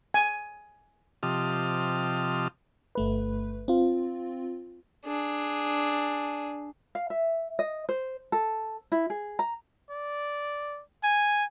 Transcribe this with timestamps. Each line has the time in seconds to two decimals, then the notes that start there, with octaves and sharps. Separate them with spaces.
0.14 G#5
1.23 C3 F3 G4 D#5 A5 F6
2.95 G1 A3 B4
3.68 C4 F4
5.06 D4 G#4
6.95 F5
7.10 E5
7.59 D#5
7.89 C5
8.32 A4
8.92 E4
9.10 G#4
9.39 A#5
9.90 D5
11.04 G#5